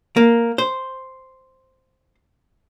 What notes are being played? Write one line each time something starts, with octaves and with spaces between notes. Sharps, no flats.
A#3
C5